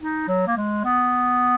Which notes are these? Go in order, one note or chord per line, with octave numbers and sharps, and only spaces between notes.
D#4
F#3
A#3
G#3
B3